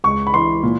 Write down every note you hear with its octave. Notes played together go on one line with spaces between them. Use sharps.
C#2 C#6
B5
E3 C6
A#2